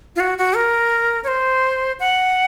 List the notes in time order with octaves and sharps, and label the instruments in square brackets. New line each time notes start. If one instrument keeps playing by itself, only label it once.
[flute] F4
F#4
F#4
A#4
C#5
C5
F#5